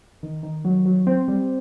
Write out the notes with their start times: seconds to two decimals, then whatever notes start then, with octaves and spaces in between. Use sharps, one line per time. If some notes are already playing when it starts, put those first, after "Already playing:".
0.23 D#3
0.43 D#3
0.65 F#3
0.86 F#3
1.07 C4
1.28 G3